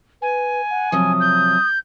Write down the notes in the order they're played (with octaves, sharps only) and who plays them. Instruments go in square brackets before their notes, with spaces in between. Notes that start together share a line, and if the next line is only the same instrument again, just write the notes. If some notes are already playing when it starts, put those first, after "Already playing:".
[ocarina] B4 [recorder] G#5
[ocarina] F#5
[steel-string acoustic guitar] C3 F3 F#3 [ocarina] D#6
[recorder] G6